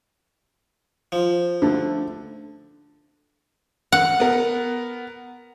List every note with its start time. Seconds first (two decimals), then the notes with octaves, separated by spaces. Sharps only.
1.12 F3
1.62 D3 A3
3.92 F#5
4.20 B3 A#4